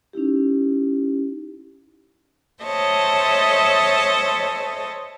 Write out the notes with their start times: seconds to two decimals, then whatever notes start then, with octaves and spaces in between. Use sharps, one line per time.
0.13 C#4 D#4 E4 G4
2.63 A4 C5 C#5 D#5 E5 A5